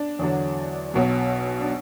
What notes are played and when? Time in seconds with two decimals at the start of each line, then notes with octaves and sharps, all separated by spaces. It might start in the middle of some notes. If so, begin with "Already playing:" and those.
Already playing: D4
0.19 E2 D3 F#3
0.94 B1 B2 F#3
1.61 D4